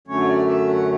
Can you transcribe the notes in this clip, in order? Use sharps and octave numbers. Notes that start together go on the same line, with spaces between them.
F#2 D3 F#3 A3 C#4 C#5
D5
E5
F#5